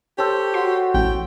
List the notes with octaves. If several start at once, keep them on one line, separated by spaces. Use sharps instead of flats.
G4 A4 C5 C#5
F#4 C6
A1 G5